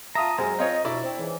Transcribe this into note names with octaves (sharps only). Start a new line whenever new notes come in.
F4 E5 A5 A#5 D#6
F#2 C3 G#3 C#4
C4 F4 C#5 D#5
F2 B2 D4 E4 D5
C4
G#2 C#3 E3